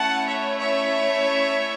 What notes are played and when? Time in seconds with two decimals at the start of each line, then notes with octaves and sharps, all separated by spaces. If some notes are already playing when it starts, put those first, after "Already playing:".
Already playing: A3 C#4 E4 F#5 A5
0.25 C#5 E5
0.58 C#5 E5